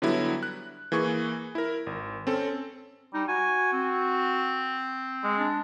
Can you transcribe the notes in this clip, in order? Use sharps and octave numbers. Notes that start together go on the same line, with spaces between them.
D3 F#3 G3 B3 E4
F#6
E3 A#3 G#4 C#6
E4 A#4
G#1
C4 C#4 A4
G3 D#4
F#4 G#5
C4
G#3
D4